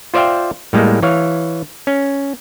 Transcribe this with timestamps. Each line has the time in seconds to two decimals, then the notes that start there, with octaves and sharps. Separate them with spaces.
0.14 F4 C5 D5 E5 F5 G5
0.73 A2 G3 G#3 A#3
1.03 E3 C#5 F5
1.87 C#4